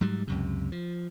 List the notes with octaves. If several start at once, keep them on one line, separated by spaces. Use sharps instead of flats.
G#2 F#3 G3
C#2 F#2 C3
F3